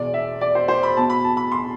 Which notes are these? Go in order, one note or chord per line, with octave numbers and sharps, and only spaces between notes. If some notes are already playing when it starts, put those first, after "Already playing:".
Already playing: E1 E2 B2 D5
E5
D5
C5
C5
B5
B1 B2 A5
B5
A5
B5
C6